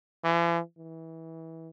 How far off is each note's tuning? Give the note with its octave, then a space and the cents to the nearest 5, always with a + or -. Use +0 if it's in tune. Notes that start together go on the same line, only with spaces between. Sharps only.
E3 +45
E3 -25